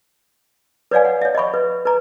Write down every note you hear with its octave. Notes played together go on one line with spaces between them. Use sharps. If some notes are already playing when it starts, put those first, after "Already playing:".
B4 C#5 D5 F5 G#5
F#5
C#5 E5
D#5 E5 B5 C#6
B4
B4 A#5